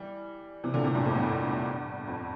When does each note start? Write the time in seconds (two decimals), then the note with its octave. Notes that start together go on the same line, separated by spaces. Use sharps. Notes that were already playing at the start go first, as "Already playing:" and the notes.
Already playing: E3 G3
0.64 C3 E3
0.74 A#2 D3
0.84 A2 C3
0.95 G2 A#2
1.05 F2 A2
1.15 E2 G2
2.08 F2